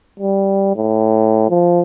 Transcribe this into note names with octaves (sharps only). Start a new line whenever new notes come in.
G3
A2
F3